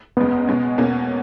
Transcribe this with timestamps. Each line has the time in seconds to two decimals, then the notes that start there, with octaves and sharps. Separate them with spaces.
0.17 F#1 E2 C#3 G#3 B3
0.47 B2 G#3 C#4
0.78 E2 B2 A#3 C#4